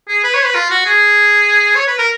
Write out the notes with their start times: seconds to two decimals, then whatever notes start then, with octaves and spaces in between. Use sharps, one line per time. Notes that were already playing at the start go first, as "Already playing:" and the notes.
0.08 G#4
0.24 B4
0.34 C#5
0.45 B4
0.55 F4
0.70 F#4
0.86 G#4
1.76 C#5
1.87 B4
1.98 A#4